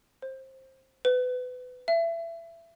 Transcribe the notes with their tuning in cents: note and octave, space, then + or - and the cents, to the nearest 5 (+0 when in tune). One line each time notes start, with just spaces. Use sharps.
C5 +20
B4 +25
E5 +25